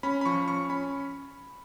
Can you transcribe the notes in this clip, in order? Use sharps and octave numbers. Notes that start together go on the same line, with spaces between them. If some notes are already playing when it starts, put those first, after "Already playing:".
C#4 B5
B5
F3 C#6
C#4 C#6
C#4 B5